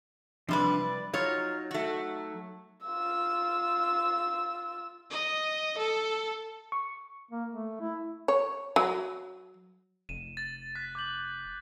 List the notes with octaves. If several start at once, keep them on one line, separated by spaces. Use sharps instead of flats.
C3 F3 G3 D4 B4 C6
D5
F#3 D#4 F4 C#5
A3 F#4
F4 E6
D#5
A4
C#6
A#3
A3
E4
C#5
F#3
F1 D#7 E7
A6
F#6 A6 B6
D6 G6 F#7